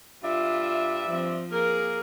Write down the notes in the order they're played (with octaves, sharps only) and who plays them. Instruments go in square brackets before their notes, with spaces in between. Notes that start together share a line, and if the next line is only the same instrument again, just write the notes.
[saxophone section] G2 D5 E5 [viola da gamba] F4
[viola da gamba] F3 C4
[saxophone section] A#3 A#4 [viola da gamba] G#4